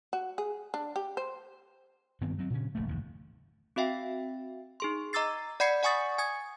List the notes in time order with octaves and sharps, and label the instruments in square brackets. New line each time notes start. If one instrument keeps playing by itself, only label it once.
[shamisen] F#4
G#4
D4
G4
C5
[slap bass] G2 D#3 B3 C4
F#3 C4
A#2 C#3 C#4
D#1 A#1 G2 A3
F1 D#2 G#2
[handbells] C4 F#4 E5 F5 G5
D#4 G#4 C6
D#5 A#5 D6 E6 A6 C7
D5 F#5 B5 G#6 C7 C#7
D5 F#5 G#5 C#6 D#6 A6
G#5 D#6 G#6